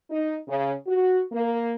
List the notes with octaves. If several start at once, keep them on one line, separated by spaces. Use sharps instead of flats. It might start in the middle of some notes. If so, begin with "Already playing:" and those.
D#4
C#3
F#4
A#3